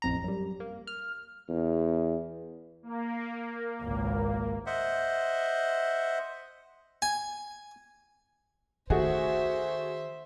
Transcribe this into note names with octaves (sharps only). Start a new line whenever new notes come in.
A1 F2 A#5
F#2 G3
A#3
F6
E2
A#3
G#1 C#2
C5 D#5 E5 F#5
G#5
D#3 A3 F#4 G#4 C5 E5